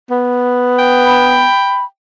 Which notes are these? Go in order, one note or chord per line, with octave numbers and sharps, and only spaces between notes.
B3
G5
B5